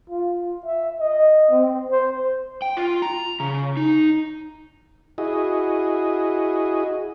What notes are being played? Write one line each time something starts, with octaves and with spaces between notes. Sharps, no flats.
F4
E5
D#5
C4
C5
G5
F4
A#5
C#3
D#4
E4 F#4 G#4 D#5